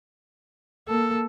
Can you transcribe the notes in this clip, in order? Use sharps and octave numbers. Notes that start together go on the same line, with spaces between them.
A#3 A4